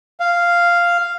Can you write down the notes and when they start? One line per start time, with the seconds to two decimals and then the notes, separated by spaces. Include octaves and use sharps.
0.20 F5